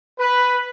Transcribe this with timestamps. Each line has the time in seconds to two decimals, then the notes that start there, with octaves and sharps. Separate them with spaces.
0.20 B4